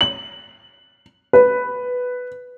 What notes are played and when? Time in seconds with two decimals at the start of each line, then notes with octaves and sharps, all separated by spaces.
0.01 F#7
1.33 B4